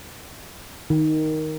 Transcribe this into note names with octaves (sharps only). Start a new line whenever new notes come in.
D#3